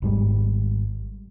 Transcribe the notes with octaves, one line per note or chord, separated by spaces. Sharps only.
G#1 G#2 G3 G#3